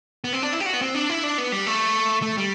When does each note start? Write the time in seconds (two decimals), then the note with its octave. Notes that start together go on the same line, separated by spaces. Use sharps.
0.24 B3
0.33 C4
0.42 D4
0.53 E4
0.60 G4
0.66 F#4
0.74 B3
0.81 C4
0.95 D4
1.10 E4
1.23 D4
1.38 B3
1.52 G3
1.66 A3
2.22 A3
2.38 G3